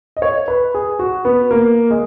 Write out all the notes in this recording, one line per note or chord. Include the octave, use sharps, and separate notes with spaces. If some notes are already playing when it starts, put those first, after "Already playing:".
D#5
C#5
B4
G#4
F#4
B3
A#3
G#3